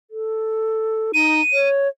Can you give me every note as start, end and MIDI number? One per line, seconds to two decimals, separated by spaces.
0.11 1.12 69
1.14 1.41 63
1.14 1.68 99
1.53 1.88 73